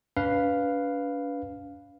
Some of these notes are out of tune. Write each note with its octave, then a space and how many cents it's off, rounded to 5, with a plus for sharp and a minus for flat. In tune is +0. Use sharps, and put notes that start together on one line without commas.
D4 -45 B4 +0 F5 +0